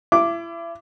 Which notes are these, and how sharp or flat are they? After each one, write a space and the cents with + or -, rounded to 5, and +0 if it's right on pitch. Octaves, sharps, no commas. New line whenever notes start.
E4 +35 D6 +0